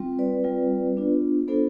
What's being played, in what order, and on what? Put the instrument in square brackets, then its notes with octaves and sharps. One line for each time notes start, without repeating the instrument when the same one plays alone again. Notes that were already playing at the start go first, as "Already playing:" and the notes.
Already playing: [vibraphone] G3 C4 F4
B4 D5
G3 C4 F4
B3 D4 F4
B3 D4 F4 A4 C5